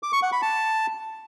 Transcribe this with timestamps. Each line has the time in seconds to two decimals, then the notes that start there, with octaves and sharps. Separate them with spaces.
0.03 D6
0.13 C#6
0.22 F#5
0.32 B5
0.42 A5